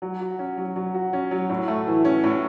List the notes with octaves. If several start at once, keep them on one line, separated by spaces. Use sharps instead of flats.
F#3
F#4
C#4
F#3
F#3
F#4
C#4
F#3
A2
A3
E3
C#4
A2